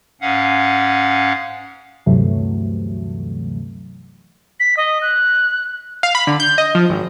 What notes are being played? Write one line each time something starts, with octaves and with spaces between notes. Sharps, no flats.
G#2 C#4 F5 F#5
D2 G2 C3 E3 F#3 A3
B6
D#5
F#6
F5
B5
D3
G6
D#5
F3
G#1